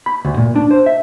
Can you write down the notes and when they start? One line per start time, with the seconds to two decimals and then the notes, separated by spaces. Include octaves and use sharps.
0.06 B5
0.25 D2
0.37 A#2
0.56 D4
0.71 C5
0.86 E5